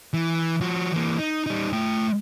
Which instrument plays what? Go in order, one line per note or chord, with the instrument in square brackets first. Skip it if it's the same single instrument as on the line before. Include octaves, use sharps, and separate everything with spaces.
[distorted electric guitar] E3
F3 F#4
E3 A#3
D#4
G3 D#4
A3 G5